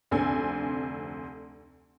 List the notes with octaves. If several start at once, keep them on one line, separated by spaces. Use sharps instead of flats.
F1 D2 C4 A4 G#5